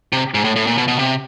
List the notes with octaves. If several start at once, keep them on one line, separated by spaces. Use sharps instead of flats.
C3
G#2
A2
A2
A#2
B2
B2
C3